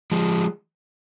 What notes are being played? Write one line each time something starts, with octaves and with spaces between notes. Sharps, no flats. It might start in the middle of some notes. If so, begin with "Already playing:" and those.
F3 G#3